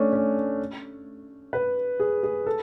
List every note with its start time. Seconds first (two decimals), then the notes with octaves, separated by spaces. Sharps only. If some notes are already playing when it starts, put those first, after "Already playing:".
Already playing: A3 C#4 D4
0.13 C#4
1.53 B4
2.00 G#4
2.23 G#4
2.46 A4